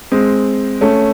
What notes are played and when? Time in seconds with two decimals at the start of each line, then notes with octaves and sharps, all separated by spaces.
0.12 G#3 C4
0.81 A3 C#4